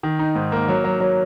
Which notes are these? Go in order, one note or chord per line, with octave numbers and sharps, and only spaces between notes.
D#3
D#4
G#2
A#3
F#3
F#3
F#3